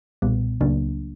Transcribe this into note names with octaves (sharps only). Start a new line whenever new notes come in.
B1 A#2 G3 B3
C#2 C#3 F#3 A#3 D4